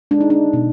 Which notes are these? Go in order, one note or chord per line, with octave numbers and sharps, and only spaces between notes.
G#3 D4
D#4
D4
B2